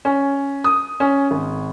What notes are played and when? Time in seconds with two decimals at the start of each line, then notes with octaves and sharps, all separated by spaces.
0.05 C#4
0.64 D#6
1.00 C#4
1.31 G#1